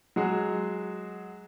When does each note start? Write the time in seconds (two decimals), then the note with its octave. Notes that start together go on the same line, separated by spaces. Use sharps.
0.16 F#3 G#3 F#4 G#4